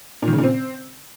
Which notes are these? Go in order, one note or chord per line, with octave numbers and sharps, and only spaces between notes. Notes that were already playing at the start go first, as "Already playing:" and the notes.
A#2
D#3
C#3
A#2
C4